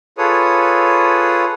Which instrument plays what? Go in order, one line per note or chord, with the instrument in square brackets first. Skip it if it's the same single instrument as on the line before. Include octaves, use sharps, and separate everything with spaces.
[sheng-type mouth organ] F4 G#4 A4 B4 C#5 D#6